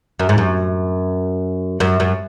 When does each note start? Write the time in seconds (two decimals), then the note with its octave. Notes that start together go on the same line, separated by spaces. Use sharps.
0.20 F#2
0.29 G#2
0.38 F#2
1.80 F#2
2.00 F#2